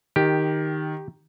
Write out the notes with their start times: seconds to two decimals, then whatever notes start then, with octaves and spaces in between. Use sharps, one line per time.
0.16 D#3 G4